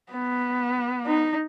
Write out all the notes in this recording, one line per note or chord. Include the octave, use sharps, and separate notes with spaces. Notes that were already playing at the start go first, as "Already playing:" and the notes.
B3
D#4